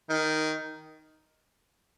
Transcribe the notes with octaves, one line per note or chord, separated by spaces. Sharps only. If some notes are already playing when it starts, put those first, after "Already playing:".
D#3